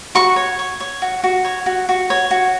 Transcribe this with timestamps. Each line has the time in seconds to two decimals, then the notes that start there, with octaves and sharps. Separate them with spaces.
0.15 F#4 C#6
0.36 C#5
0.59 C#5
0.80 C#5
1.02 F#4
1.24 F#4
1.45 C#5
1.66 F#4
1.89 F#4
2.10 C#5
2.31 F#4